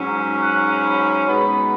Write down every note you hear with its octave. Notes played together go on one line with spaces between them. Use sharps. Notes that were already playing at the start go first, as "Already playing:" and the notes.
Already playing: G#2 F#3 C#4
F#5
B5
B2 G#3 B3 D#4 B5